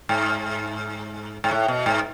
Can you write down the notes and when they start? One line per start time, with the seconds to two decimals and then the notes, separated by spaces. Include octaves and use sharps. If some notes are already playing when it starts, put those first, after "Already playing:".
0.09 G#2
1.44 G#2
1.51 A2
1.68 B2
1.86 G#2